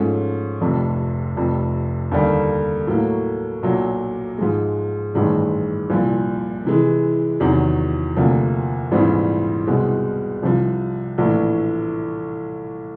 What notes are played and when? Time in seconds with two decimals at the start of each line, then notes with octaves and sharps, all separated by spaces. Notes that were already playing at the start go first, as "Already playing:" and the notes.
Already playing: G#2 F3 A3 C#4
0.61 F1 F2 C3
1.36 F1 F2 C3
2.11 D#2 D3 G3 A#3
2.87 A2 F#3 A#3
3.63 B1 A#2 F#3
4.38 G#2 F3 G#3
5.14 A1 G2 D#3 G#3
5.90 C2 A#2 F3
6.65 C3 E3 G#3
7.40 E2 C3 D#3 F#3
8.16 D2 C3 F3 A#3 D4
8.92 A#1 G#2 E3 G3 C4
9.67 C2 B2 G#3 C4
10.43 C2 C3 F3
11.18 A#1 A2 E3